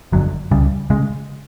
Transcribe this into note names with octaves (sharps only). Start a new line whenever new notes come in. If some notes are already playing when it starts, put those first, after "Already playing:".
G1 F2 D3 F#3
C#2 C#3 G3
C#3 G#3